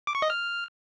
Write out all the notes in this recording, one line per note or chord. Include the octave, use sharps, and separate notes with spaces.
D6
C#6
D#5
F6